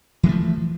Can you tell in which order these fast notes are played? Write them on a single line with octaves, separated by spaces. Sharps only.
E3 G#3 A3 F3